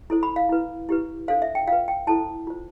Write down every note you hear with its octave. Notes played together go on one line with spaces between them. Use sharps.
E4 A4 C5
B5
F5
E4 B4
E4 G4 B4
D4 A4 C5 F5
E5
G5
F4 B4 F5
G5
E4 A4 C5 A5
F4 C5